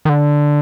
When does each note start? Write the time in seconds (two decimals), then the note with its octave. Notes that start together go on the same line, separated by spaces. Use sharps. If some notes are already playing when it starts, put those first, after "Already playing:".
0.05 D#3
0.09 D3